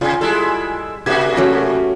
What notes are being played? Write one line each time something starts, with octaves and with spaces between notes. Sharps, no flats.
C3 F4 G#5
G3 G#3 E4 A4
C3 A#3 F#4 G4 E5 G#6
F#3 A3 C#4 G4 B5